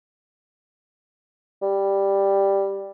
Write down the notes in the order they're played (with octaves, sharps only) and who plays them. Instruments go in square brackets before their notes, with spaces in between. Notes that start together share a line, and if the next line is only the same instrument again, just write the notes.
[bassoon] G3